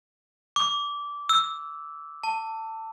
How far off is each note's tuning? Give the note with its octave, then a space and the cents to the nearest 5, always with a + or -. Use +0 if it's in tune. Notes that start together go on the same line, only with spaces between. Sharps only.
D6 -20
E6 -5
A5 +20